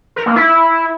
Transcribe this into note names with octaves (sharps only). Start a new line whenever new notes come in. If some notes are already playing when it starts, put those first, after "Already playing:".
A#4
A#3
E4